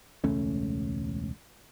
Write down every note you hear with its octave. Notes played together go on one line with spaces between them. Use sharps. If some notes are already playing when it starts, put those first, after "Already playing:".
E1 C#2 A3 C#4